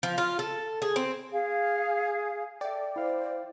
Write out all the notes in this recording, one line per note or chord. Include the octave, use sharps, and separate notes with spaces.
F3
F4
A4
G#4
C4
G#4 F5
A4 D5 E5 G5
E4 C5 F5